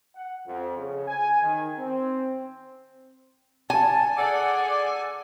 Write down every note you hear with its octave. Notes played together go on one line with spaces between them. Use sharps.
F#5
F2
C#3
G#5
D#3
C4
G#5 A5
G#4 A4 D5 F#5